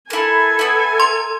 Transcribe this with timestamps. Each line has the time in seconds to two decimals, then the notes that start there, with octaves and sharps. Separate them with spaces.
0.10 E4 A4 A#4 G#5
0.59 B3 E4
1.00 A#4 C6